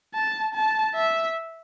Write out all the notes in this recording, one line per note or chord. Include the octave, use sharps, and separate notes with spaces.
A5
A5
E5